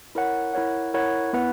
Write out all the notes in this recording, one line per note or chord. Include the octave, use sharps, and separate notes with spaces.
E4 A#4 C#5 F#5
E4 A#4 C#5 F#5
E4 A#4 C#5 F#5
B3 E4 B4 F#5